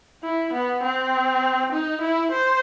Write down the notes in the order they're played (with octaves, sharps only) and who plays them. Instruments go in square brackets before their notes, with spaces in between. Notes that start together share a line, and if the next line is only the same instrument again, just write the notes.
[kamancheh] E4
B3
C4
D#4
E4
C5